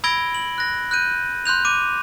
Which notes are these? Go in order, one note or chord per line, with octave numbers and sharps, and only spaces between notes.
B5 E6 G#6 A#6 D7 G7
F#7
F#6 A#6
F#6 G6 D#7
C6 F#6 G6 F7
D6 D#7